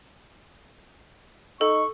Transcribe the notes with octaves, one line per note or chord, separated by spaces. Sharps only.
D#4 A4 C#6